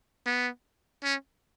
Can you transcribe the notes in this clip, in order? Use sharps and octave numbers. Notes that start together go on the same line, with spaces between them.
B3
C#4